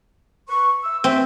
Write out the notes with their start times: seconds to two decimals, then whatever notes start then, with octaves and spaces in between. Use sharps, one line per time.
0.48 B4 C#6
0.83 E6
1.04 D#2 C4 C#4 E5